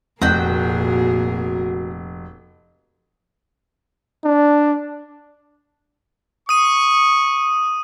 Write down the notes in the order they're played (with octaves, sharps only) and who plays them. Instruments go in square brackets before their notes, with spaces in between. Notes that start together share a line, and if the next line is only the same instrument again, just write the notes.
[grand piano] F1 [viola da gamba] A#2 G#4 A#4 [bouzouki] F#4 G5
[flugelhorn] D4
[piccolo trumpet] C#6 [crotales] D#6 D#7